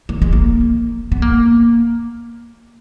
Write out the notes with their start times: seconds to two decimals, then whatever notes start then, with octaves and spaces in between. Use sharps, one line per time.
0.09 A#3
0.22 G#3
0.33 A#3
1.12 B3
1.22 A#3